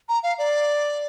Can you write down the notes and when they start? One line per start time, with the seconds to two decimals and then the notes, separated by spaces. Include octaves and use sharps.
0.09 A#5
0.23 F5
0.38 D5